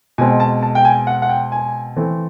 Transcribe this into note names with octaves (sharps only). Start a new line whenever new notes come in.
B2 G#3 C4 G#5
A5
A5
G5
G#5
F#5
F#5
G5
G#5
E3 A3 C4